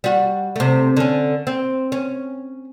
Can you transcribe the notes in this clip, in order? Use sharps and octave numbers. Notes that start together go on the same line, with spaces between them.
G3 F#4
C3 A3
D3 C#4
C4
C#4